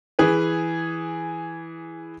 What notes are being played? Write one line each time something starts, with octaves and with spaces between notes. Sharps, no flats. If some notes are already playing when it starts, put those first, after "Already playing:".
E3 G#4 B4